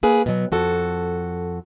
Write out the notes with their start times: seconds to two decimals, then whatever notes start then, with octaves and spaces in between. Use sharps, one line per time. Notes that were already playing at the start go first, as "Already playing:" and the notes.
0.03 A#3 G#4 B4
0.26 B2 F#3
0.52 F2 F#4 A4